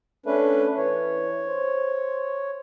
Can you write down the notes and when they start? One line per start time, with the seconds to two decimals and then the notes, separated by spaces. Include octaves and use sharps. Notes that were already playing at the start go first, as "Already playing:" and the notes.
0.26 A3 C#4 D4 B4
0.77 E3 C#5
1.48 C5